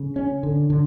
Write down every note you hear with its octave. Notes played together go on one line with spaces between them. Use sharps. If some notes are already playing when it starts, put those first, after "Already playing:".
Already playing: C#3
C#4
D3
D3